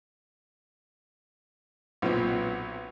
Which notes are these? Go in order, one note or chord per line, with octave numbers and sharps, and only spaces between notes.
B1 A#2 C4